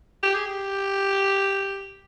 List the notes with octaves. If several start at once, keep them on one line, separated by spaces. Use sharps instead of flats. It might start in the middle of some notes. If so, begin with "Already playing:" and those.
G4
G#4
G4